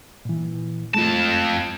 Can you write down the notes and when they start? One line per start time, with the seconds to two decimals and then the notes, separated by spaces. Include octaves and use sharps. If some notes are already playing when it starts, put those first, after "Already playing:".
0.25 A#2 E3
0.94 F2 G#3 A3 F4 A5